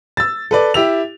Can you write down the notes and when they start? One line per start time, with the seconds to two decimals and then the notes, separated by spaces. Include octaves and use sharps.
0.17 E6 A6
0.51 A4 B4 D5
0.74 E4 G4 E6 F7